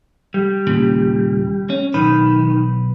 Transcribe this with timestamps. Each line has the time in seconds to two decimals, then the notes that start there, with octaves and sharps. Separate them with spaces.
0.34 G3
0.67 D#2 A#2 C#3
1.70 C#4
1.94 B1 D#3 B4